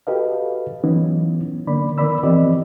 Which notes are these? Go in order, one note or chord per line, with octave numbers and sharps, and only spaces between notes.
F#4 G4 A4 B4 D#5 F5
E3 F#3 B3 C#4 D#4
D3 A#3 D5 B5
D#3 B3 A#4 D5 B5 E6
E3 F3 C4 G4 D5 D#5